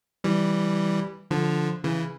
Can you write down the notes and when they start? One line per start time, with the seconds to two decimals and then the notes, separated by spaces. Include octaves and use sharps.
0.24 E3 G3
1.31 D3 F3
1.84 C#3 E3